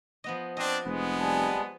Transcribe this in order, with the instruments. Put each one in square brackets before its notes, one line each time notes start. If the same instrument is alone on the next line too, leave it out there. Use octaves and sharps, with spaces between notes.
[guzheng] F3 B3 D#5
[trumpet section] C4 D4 [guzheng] D#5
[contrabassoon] F1 [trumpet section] G#3 B3
[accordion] G3 G#5 A5